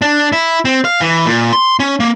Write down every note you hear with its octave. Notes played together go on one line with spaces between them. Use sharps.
D4
E4
C4
F5
E3
A#2
C6
C#4
A#3